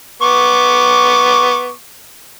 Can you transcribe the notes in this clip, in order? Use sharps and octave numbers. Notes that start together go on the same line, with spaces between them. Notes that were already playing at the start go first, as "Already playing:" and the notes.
B3 C#6 D6